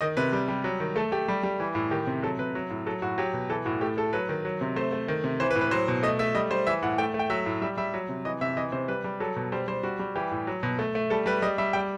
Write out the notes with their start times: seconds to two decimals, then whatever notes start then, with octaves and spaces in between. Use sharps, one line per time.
0.01 D#3 D#5
0.17 C3 B4
0.33 G3
0.48 G3
0.64 F#3
0.80 D#3
0.96 A3 A4
1.12 A3 G4
1.28 G3
1.43 G3
1.60 E3
1.75 A2
1.91 D#3 G4
2.07 C3
2.22 F#3 A4
2.39 C3 B4
2.55 F#3
2.70 A2
2.86 F#3 A4
3.02 A2 F#4
3.18 F#3 G4
3.34 B2
3.49 E3 A4
3.65 A2 F#4
3.81 A3 G4
3.97 A3 A4
4.13 F#3 B4
4.29 D#3
4.45 F#3
4.61 C3
4.76 A3 C5
4.92 A3
5.08 D#3
5.24 C3
5.40 E3 C5
5.51 B4
5.55 A2
5.61 B4
5.71 F#3 C5
5.88 B2
6.03 A3 D#5
6.19 A3 E5
6.35 G3 D#5
6.51 G3 C5
6.67 E3 E5
6.83 A2 F#5
6.98 A3 G5
7.14 A3
7.19 G5
7.30 F#3 E5
7.46 A2
7.62 G3 E5
7.77 G3 E5
7.94 F#3
8.09 C3
8.25 E3 D#5
8.41 C3 E5
8.57 E3 D#5
8.72 C3 C5
8.88 G3 B4
9.04 G3
9.20 F#3 A4
9.36 B2
9.52 G3 C5
9.68 G3 C5
9.83 G3 F#4
9.99 G3
10.16 E3 G4
10.31 A2
10.47 F#3
10.63 B2
10.79 A3
10.95 A3
11.10 G3 A4
11.26 G3 B4
11.42 G3 D#5
11.58 G3 E5
11.73 G3 G5